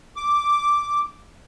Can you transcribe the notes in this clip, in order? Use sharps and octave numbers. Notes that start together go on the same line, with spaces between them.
D6